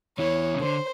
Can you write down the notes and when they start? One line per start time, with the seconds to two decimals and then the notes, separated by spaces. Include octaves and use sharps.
0.18 E2 E3 C#5
0.54 C#3
0.61 D3 C5